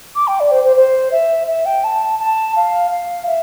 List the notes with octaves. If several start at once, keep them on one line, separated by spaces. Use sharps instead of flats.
D6
G5
D5
C5
C5
C5
E5
E5
G5
A5
A5
F5
F5
E5